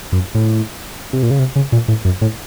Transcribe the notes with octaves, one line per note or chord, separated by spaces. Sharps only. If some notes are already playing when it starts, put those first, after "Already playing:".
F#2
A2
C3
A#2
C#3
C3
C#3
A#2
A2
F#2
A2